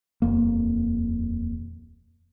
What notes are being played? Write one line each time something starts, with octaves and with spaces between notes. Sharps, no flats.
D#1 F2 A#3